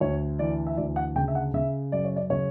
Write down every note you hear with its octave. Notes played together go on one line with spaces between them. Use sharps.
D2 C#5
E3 D5
E5
D2 D5
F#5
C#3 G5
E5
F#5
C#3 E5
F#2 D5
C#5
D5
C#3 C#5